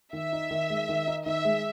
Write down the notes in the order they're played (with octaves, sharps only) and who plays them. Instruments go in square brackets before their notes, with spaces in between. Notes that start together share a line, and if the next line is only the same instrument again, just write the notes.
[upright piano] D#3 [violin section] E5
[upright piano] D#4
D#3
G#3
D#3
D#4
[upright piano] D#3 [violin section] E5
[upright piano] G#3